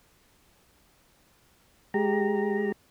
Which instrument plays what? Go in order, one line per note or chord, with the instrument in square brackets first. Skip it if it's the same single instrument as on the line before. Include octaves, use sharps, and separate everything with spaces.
[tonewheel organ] G#3 G4 A#5